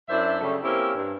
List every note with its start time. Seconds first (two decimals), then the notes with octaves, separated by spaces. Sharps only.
0.09 F#2 D4 E4 C5 E5
0.40 C#3 F#3 G3 A3
0.63 A#3 C4 C#4 E4 G4
0.95 G2